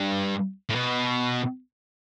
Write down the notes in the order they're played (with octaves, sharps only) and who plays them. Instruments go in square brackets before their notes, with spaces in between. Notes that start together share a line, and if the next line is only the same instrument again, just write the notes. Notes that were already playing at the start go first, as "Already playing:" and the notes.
Already playing: [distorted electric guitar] G2
A2
B2